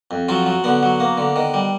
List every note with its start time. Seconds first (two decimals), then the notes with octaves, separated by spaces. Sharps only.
0.11 F2
0.28 F3 F#3 F4
0.46 F#3
0.64 D3 B3
0.83 F#3
1.00 A#3
1.18 D3
1.36 D#3
1.54 G3